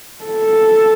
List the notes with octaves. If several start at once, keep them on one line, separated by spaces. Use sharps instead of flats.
A4